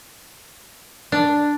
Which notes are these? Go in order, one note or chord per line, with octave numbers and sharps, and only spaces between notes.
D4